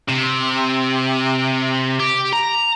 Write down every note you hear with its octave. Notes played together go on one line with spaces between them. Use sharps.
C3
G4
A#5